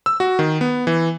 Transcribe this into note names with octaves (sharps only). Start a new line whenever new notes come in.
E6
F#4
D#3
B3
E3